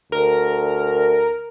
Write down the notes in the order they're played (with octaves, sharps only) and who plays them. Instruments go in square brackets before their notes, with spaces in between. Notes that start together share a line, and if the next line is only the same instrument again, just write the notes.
[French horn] D2 [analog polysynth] A#4